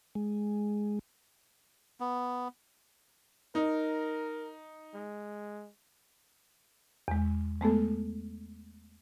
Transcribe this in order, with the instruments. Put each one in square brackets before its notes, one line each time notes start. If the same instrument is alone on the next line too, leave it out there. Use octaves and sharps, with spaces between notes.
[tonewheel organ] G#3
[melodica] B3
[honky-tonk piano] D#4 [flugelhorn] A#4
[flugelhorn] G#3
[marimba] E2 G#3
G#3 A3 B3 A4